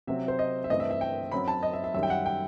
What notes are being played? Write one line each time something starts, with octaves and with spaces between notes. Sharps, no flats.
C3 F#3 C4 E5
C5
D#5
E5
G2 E3 A3 C4 D#5
E5
E5
G5
F#2 F#3 C4 B5
A5
D#5
E5
E5
F#2 D#3 G3 E5
G5
F#5
G5